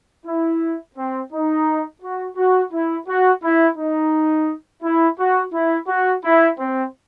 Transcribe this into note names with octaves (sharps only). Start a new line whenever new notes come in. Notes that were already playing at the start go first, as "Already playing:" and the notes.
E4
C4
D#4
F#4
F#4
E4
F#4
E4
D#4
E4
F#4
E4
F#4
E4
C4